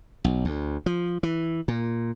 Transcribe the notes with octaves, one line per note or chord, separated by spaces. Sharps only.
B1
D2
F3
E3
A#2